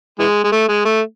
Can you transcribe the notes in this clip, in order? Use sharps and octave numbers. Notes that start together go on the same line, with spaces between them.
E3 G#3
G#3
A3
G#3
A3